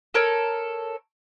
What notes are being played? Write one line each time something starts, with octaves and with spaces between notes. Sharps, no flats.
A4 A#4 C#5